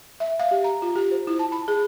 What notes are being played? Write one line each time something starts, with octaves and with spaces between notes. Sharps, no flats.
E5
F5
G4
A#5
F4
G4
C5
E4
A5
B5
G#4